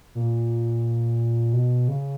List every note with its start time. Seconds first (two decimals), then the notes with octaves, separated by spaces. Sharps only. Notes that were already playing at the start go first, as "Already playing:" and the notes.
0.15 A#2
1.53 B2
1.88 C#3